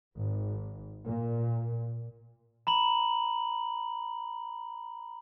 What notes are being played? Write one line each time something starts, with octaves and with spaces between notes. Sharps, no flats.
G#1
A#2
A#5 B5 F#7